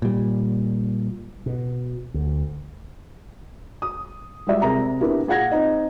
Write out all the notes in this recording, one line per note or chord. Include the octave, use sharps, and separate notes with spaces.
A#2 G3
B2
D2
D#6
G3 G#3 F4 D5 E5
C3 G#4 A#4 A#5
B3 D4 E4 G4 A#4
A#2 G#4 F5 F#5 G#6 A#6
C4 D#4 D#5